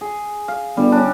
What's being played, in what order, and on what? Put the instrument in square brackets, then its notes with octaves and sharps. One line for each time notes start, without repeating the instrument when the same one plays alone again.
[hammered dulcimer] G#4
F5
[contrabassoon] G1 [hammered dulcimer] G3
[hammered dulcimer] C#4 D4